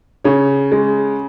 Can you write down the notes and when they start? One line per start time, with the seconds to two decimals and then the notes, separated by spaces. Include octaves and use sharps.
0.24 C#3 C#5
0.72 G#3